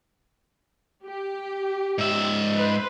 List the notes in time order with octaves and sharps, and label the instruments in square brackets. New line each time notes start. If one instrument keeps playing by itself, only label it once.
[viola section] G4
[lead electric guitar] G#2 E5
[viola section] B4 C5